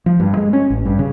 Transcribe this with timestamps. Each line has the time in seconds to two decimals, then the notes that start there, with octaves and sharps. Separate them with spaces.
0.06 F3
0.20 G2
0.37 G#3
0.53 C#4
0.70 A1
0.85 G2
0.99 C#3